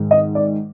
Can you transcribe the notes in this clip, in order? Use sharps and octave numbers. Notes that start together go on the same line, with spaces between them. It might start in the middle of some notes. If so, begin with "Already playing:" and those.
Already playing: G#2 D#3 G#3
D#5
D5